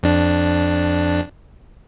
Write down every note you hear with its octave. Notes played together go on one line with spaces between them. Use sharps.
F2 D4